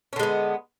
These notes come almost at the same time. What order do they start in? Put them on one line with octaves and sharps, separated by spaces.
C#4 D3 G#3 B3